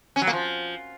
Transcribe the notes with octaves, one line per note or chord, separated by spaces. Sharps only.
C#4
F#3
A#3
F3